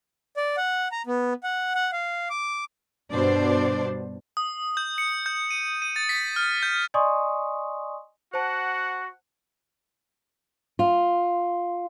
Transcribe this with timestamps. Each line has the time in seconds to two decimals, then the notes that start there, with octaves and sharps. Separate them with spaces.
0.37 D5
0.57 F#5
0.92 A#5
1.06 B3
1.43 F#5
1.75 F#5
1.92 F5
2.30 D6
3.12 G2 B2 D4 C5 D5
4.37 D#6
4.77 G6
4.98 C#7
5.26 G6
5.51 D#7
5.82 D#7
5.96 A6
6.09 B6
6.36 F6
6.63 G6
6.94 D5 D#5 G#5 C6 C#6 D#6
8.34 F#4 C5 F#5 A5
10.79 F4